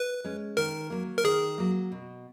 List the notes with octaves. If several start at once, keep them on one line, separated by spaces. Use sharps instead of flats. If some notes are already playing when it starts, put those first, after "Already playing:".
Already playing: B4
G#3 C#4
D#3 A#4
F#3 A#3
A#4
D#3 G#4
F#3 A#3
B2